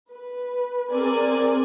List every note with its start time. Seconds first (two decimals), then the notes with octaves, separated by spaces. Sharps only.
0.11 B4
0.92 C4 G#4 A#4 D5 G#5